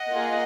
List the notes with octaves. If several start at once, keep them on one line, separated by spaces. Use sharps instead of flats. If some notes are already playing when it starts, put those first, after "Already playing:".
Already playing: D#5 F#5
A#3 F4 G#4